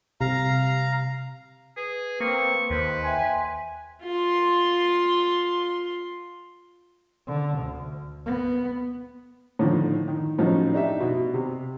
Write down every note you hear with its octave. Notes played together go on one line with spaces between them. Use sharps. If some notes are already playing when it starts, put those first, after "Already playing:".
C3 F5 A#5
G#4 B4
A#3 C4 C#6
D#2 B4 C5
E5 G5 G#5 C6
F4 C6
D3
D2
B3
A2 D3 D#3 F3
D#3
A2 F3 F#3 C#4 D#4
D4 D#4 G4 E5
B2 F#4
C3